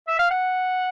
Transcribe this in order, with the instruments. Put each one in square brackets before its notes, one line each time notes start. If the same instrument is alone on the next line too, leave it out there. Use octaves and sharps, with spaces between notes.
[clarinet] E5
F5
F#5